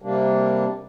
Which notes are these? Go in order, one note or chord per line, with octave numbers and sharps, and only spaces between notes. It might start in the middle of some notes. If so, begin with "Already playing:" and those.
C3 G3 A#3 D4